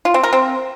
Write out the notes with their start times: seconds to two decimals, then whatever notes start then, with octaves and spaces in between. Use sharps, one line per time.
0.05 F4
0.14 C4
0.23 A#4
0.33 C4